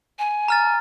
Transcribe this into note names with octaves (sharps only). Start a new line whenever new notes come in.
G#5
A#5 F6 A6